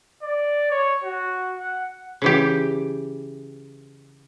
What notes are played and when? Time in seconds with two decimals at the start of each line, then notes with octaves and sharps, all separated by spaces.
0.23 D5
0.71 C#5
1.04 F#4
1.59 F#5
2.22 C#3 E3 G4